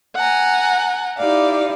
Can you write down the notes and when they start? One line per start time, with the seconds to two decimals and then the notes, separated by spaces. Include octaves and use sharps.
0.15 F#5 G#5 A#5
1.17 D#4 E4 G4 D5 F5